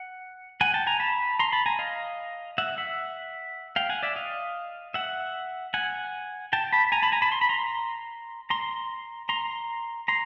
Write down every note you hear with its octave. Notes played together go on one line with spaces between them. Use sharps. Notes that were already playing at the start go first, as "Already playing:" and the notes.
Already playing: F#5
F#5 G#5
G5 A5
G#5 A#5
A5 B5
A#5 C6
A5 B5
G#5 A#5
D#5 F5
E5 F#5
E5 F#5
F5 G5
F#5 G#5
D5 E5
D#5 F5
E5 F#5
F#5 G#5
G5 A5
A5 B5
G#5 A#5
A5 B5
G#5 A#5
A5 B5
C6
B5
A#5 C6
A#5 C6
A#5 C6
A#5 C6